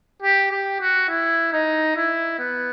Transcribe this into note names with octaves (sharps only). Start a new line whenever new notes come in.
G4
G4
F#4
E4
D#4
E4
B3